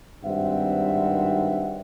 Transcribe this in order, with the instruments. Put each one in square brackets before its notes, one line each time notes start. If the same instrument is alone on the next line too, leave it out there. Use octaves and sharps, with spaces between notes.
[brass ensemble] G#1 G2 D#3 C4 E5 F#5